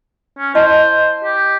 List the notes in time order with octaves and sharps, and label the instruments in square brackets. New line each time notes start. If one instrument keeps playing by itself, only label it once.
[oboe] C#4
[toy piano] E4 D#5 A5 [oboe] C5
[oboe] G4